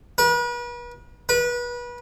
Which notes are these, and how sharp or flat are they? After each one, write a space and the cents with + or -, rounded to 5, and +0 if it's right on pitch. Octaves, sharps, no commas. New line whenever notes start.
B4 -40
B4 -30